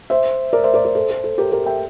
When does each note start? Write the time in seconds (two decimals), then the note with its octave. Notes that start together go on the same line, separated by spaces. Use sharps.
0.10 C5 E5
0.53 A#4 D5
0.64 C5 E5
0.74 A#4 D5
0.85 A#4 D5
0.95 A4 C5
1.10 A4
1.24 A4
1.38 G4 A#4
1.52 G4 A#4
1.66 E5 G5